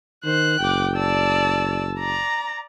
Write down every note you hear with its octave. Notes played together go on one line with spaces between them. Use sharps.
D#3 C5 F#6
F#1 G5 D6
D5 A5 E6
D5 A#5